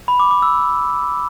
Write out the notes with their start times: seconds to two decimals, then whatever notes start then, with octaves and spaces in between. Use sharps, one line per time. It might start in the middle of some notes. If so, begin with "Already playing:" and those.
0.08 B5
0.20 D6
0.31 D6
0.42 E6